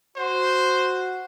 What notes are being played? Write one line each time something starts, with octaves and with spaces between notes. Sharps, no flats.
F#4 C5